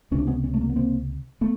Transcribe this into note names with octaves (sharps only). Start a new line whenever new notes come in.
C#2 C3 C#4 D4
B3 C#4
B3 C#4
A3
A#3
B3
A#3 C4
A3 B3